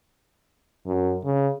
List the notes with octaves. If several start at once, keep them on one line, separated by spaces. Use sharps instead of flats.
F#2
C#3